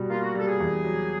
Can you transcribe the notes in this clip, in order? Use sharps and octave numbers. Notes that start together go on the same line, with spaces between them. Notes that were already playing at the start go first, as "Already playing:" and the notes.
Already playing: B2 G3
A#3 F4
F#4
G3 A4
G#4
E2
F#3